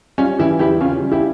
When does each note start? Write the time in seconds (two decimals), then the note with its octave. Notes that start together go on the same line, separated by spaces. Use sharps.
0.18 G3 C#4 F4
0.38 E3 E4 G4
0.59 E2 E4 G4
0.81 C#3 C#4 F4
1.02 G3
1.12 E4 G4